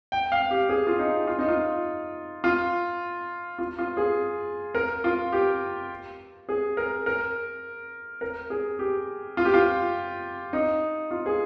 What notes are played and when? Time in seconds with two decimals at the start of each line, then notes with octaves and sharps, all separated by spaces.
0.12 G5
0.32 F5
0.51 G4
0.69 G#4
0.87 F4
0.99 D#4
1.27 F4
1.39 D#4
1.48 F4
2.44 F4
3.59 F4
3.79 F4
3.97 G#4
4.75 A#4
5.04 F4
5.32 G4
6.49 G#4
6.77 A#4
7.06 A#4
8.21 A#4
8.50 G#4
8.79 G4
9.37 F4
9.45 G4
9.54 F4
10.53 D#4
11.11 F4
11.26 G#4